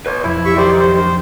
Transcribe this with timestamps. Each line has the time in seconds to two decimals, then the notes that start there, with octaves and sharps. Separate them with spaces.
0.06 B4 C#5
0.24 B1 F2 E4
0.45 G4 E5 C#6
0.57 D#3 G4 C5 D5
0.80 C4 C5
0.96 D4 C5